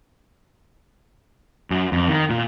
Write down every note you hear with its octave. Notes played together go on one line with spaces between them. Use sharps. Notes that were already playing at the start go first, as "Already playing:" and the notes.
F#2
F2
D#3
A#2